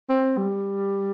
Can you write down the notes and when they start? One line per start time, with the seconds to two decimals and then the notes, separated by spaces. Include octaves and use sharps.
0.09 C4
0.38 G3